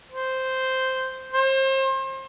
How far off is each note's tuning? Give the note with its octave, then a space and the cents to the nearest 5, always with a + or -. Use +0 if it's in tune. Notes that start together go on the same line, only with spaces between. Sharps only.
C5 -5
C5 +35